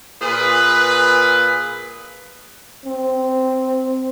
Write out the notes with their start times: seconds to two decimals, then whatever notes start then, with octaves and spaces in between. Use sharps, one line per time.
0.22 A#2 G#4 B4
2.85 C4